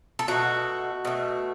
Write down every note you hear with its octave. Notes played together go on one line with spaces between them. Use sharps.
A4
B2 A3 F#4
B2 A3